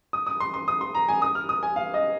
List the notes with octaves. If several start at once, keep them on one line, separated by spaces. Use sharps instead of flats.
D#6
D#6
C6
C6
D#6
C6
A#5
G#5
D#6
F6
D#6
G#5
F5
D#5